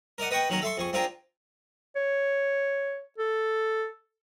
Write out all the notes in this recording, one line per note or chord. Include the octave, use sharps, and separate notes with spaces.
A#4 D5 D#5 F#5
B4 D#5 F#5 G5 C#6
D#3 F#3 C#4 F#4 A#4
A4 E5 C6 C#6
F2 G#4 C#6
C4 D4 F4 G4 G#4 A#4
C#5
A4